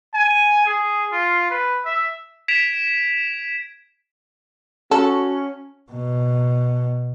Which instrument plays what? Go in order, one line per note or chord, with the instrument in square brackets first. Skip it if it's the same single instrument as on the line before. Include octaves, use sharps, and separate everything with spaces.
[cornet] G#5
G#4
F4
B4
E5
[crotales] G#6 B6 D7 E7 F7
[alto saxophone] C#4 [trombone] F#4 [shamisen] A4
[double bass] B2